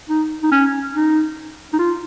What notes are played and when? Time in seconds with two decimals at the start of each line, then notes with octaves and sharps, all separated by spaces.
0.10 D#4
0.43 D#4
0.52 C#4
0.94 D#4
1.73 D#4
1.79 F4